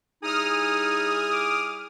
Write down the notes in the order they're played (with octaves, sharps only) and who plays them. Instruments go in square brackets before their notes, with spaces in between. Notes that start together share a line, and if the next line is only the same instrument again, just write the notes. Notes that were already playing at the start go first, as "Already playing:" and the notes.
[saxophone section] G3 E4 G#4 [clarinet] D#4 [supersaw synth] D#6 F6
[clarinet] D6